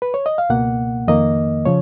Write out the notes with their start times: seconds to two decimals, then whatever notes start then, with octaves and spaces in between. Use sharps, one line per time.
0.02 B4
0.14 C#5
0.26 D#5
0.38 F5
0.49 C#2 B2 A#3 F#5
1.07 F2 D#3 A#3 D#5
1.66 C#3 F3 C#5